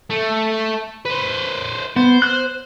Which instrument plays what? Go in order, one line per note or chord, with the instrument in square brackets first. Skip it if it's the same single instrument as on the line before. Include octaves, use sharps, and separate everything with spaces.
[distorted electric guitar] A3
B4 C5
[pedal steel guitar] B3 [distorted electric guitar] C5
[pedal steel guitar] F#6